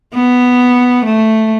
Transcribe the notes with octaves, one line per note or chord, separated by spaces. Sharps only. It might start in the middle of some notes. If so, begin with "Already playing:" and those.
B3
A3